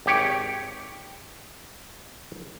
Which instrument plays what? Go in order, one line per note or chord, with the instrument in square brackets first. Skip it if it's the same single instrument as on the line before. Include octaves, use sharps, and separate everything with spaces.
[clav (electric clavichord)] G#1 G4 C#5 G5